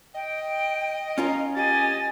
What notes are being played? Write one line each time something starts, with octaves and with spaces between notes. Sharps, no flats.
D#5 G5
C#4 F4 A#4
G4 D#5 G#5 A6